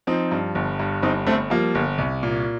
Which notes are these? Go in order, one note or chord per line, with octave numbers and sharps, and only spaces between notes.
F3 C4 D#4
G2
G1
G2
G1 C4 D#4
G1 A3 C4
F3 G3 A#3
G1
C2
A#2